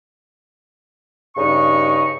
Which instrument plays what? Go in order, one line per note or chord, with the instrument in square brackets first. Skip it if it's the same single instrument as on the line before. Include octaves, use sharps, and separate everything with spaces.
[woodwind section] G2 C#3 D#4 C#6